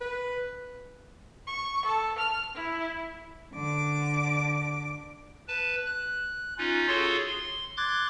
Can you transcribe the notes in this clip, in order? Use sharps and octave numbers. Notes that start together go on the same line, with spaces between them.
B4
C#6
A4
F6
E4
D3 D6
B4 A5
F#6
C#4 D#4 F4
F4 F#4 G#4 A4 C#5 C6
C6
C6 D6 F#6 G#6 A6